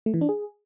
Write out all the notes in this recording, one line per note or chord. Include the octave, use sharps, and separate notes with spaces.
A3
E3
D4
G#4